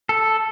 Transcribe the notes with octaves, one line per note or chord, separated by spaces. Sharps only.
A4